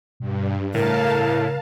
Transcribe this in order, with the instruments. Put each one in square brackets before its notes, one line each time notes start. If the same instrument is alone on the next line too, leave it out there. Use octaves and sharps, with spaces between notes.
[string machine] G2 [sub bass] B2
[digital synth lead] A2 [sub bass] C#3 [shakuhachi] A#4 [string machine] F5 A5